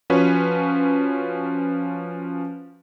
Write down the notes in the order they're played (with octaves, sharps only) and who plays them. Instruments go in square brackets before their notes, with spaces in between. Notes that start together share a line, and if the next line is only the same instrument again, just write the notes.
[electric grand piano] F3 C#4 F#4 B4 C#5